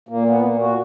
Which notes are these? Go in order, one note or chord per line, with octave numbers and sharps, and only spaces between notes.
A#2 A#3
B3
A#2 A#3
F#4